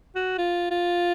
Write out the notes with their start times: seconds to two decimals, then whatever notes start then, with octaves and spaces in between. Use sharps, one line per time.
0.15 F#4
0.38 F4
0.71 F4